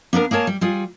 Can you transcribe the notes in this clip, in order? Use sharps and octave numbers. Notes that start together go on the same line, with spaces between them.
A#3 B3 D4 A#4
A#3 G#4 A#4 C#5 A5
G3
G3 F4 G#4